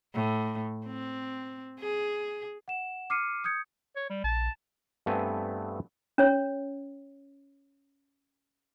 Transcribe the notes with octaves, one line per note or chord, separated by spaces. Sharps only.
A2
C4
G#4
F#5 E7
D6 F6 C7 C#7 D#7
D#6 G6 G#6 C#7
C#5
G3
A#1 A5
G2 A3 B3 C4 G#5
C#4 C#5